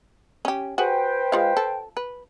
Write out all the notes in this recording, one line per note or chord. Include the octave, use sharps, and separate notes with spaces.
C#4 G4
F#4 G#4 B4 C5 G5
G#3 F4 F5
A4
B4